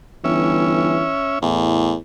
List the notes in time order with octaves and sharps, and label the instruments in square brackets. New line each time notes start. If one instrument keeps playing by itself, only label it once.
[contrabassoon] G1 [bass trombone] E3 [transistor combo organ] C#4 E5
[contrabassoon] E2 [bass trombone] A2